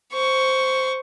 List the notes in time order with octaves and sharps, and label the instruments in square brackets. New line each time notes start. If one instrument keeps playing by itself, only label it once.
[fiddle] C5 C#6